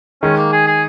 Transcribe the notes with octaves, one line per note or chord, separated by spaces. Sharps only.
D#3 G#3 C#4
A#3
G#4
G#4